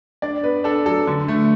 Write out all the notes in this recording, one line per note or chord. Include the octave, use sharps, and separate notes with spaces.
D4 D5
B3 B4
D4 A4
F#3 A4
D3
A3